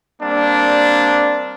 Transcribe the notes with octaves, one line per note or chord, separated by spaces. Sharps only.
G3 A#3 C4 D4